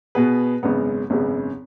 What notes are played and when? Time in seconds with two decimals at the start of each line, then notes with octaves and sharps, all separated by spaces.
0.15 B2 B3 G#4 B4
0.63 G#1 F#2 C#3 G#3 B3
1.10 G#1 F#2 C#3 G#3 B3